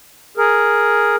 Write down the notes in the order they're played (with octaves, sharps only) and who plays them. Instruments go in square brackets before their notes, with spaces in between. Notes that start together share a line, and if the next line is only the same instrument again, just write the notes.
[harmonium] G#4 A#4